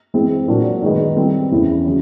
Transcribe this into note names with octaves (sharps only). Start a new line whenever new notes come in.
E3 G#3 C4
A#2 F#3 A#3 D4 F4
D#3 G#3 B3 D#4
G3 C4 E4 A4 C5
E2 C#3 E3
C#3 F#3